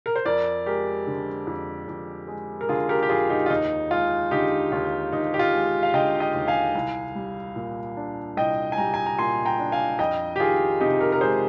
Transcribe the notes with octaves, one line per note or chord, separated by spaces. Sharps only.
A#4
C5
F2 A#4 D5
G#3 G4 A#4
D3
F2
F2
G#3
A#4
D3 F4 G#4
G4 A#4
G4
F2 F4 G#4
D#4 G4
F4
D#2 D#4
G#3 F4
D3 D#4 G4
D#2 F4
D#2 D#4
G4
F4
G#3
F5
D3 D#5 G5
D#5 G5
D#2
F5 G#5
C2
G3
A#2
D4
C2 D#5 G5
G#5
G3 G5 A#5
G#5
A#5
A#2 G#5 C6
G5 A#5
D4
F5 G#5
F2 D#5 G5
G4
D#3 F4 G#4
C3 D#4 G4
G4 A#4
A#4
G#3 G#4 C5